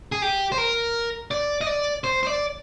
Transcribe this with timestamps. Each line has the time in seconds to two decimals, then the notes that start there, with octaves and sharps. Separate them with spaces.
0.12 G#4
0.22 G4
0.52 C5
0.58 A#4
1.31 D5
1.61 D#5
1.67 D5
2.04 C5
2.23 C5
2.27 D5